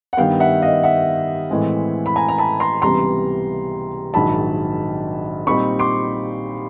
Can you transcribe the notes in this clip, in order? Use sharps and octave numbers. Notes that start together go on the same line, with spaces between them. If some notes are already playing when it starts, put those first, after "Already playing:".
F#5
G2 D#3 G3 B3 F5 G5
E5 F#5
D#5 F5
E5 F#5
A2 E3 G#3 C4
B5
G#5 A#5
A#5
A5 B5
A#5 C6
C#2 C3 E3 G3 B3 A#5 C6
A#1 G#2 D#3 F#3 A5 B5
A#2 G3 C4 D#4 B5 C#6
C6 D6